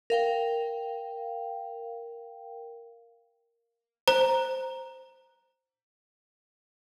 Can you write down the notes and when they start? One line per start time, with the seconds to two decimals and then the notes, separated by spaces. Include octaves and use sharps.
0.10 A#4 F5 G5
4.08 C5 A#5